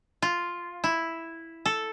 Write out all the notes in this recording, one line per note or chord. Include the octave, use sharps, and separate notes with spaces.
F4
E4
A4